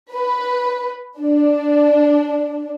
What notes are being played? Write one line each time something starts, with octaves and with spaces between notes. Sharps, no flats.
B4
D4